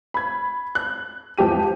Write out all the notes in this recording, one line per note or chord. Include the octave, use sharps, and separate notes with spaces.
B5 G#6
F#6
E2 F3 G4 D#7